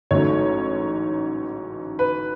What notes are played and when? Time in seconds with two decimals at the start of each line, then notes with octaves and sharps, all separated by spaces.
0.11 A1 G#2 F#3 A3 C#5
1.99 B4